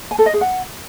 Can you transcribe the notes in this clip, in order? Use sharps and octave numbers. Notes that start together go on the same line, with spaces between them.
G#5
A4
D#5
G#4
F#5